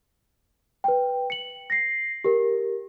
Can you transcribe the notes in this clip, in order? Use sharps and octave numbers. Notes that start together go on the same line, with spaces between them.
B4 G5
C#7 F#7
A#6 C7
G4 A#4